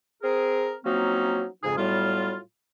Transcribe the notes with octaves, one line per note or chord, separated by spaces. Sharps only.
C4 G#4 A#4
F3 F#3 A#3 C4 C#4 D#4
F2 G#2 C#3 D#4 G#4
A2 F#3 G3 B3 F4